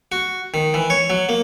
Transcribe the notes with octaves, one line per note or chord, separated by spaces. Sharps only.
F#4
D#3
E3
C#5
F#3
A#3